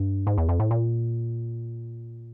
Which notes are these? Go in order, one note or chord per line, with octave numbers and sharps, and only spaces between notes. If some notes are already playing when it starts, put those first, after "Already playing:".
Already playing: G2
G#2
E2
F2
A2
A#2